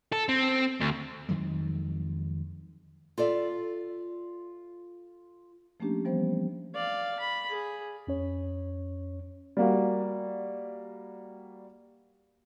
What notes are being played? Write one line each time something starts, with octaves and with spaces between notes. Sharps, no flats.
A4
C4
D2
F2 D#3 F#3 G#3
F4 A4 D5 E5
F3 A3 A#3 C#4 D4 G4
E3 F3 G3 B3 C5
D5 F5
B5
G#4
F2 C#4 C#5
G3 A#3 F#4